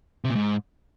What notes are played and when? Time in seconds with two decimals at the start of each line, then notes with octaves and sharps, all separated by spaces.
0.24 C3
0.30 A#2
0.36 G#2